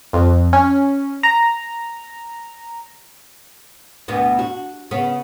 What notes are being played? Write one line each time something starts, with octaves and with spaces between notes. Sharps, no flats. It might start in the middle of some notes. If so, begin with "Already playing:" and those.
F2
C#4
A#5
D2 B2 B3
F#4
C#3 B3